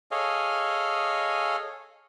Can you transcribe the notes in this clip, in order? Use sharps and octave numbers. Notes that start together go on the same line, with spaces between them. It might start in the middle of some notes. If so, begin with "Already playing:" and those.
G#4 A4 C#5 D#5 F5 G#5